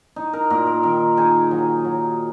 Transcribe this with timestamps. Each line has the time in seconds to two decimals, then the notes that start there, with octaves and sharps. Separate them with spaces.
0.16 D#4
0.33 A#4
0.50 A#2 A#4
0.67 A#4
0.83 D#3 A#4
1.17 D#4 G#4
1.51 F#3
1.85 F#3